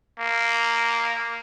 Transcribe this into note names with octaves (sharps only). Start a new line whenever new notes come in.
A#3